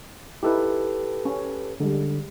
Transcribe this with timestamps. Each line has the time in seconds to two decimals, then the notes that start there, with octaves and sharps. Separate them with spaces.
0.43 D#4 E4 G4 A4 B4
1.25 C#4
1.80 D3 G3 G#3